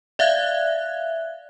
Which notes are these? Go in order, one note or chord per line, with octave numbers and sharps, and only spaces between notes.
D5 E5 F5 F#6 G#6